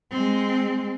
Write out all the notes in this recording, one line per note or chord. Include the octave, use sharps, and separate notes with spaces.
G#3 C4